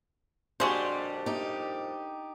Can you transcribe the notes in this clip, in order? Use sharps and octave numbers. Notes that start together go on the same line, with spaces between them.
F2 A#2 G3 D4 F#4 G#4 C5
D#4 G4